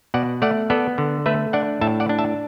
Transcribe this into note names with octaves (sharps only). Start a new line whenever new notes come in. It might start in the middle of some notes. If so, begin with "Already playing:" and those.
B2 D5 F#5
A3 D5 F#5
B3 A4 D5
D3
A3 B4 E5
D4 D5 F#5
A2 E5 A5
D5 F#5
D4
E5 A5